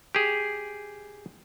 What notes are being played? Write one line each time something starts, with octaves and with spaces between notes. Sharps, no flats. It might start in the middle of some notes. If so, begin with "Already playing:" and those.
G4 G#4